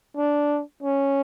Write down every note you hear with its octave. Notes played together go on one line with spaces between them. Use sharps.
D4
C#4